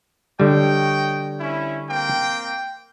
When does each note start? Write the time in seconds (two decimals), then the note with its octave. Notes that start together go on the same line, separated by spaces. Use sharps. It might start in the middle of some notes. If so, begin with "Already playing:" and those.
0.40 D3 G3 C#5 D#5 G5
1.40 C#4 E4
1.89 A#3 C4 G5